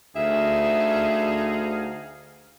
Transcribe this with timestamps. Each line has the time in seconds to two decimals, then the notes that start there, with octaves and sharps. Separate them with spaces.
0.16 D2 D#4 G#4 E5 F5